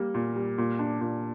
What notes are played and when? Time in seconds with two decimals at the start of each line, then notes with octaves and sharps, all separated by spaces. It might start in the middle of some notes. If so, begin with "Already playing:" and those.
Already playing: G3 A#3
0.14 A#2
0.36 G3
0.58 A#2
0.79 D4
1.01 A#2